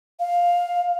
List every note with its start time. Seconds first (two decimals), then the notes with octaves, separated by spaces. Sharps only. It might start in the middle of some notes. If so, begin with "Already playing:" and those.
0.20 F5